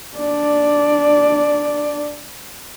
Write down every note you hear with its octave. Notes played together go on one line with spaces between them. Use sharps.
D4 D5